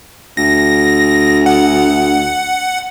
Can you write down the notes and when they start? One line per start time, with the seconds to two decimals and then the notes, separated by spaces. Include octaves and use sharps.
0.37 D2 A#6
1.46 F#5